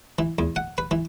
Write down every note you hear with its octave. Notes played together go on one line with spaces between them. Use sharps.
E3
E2
F#5
B4
E3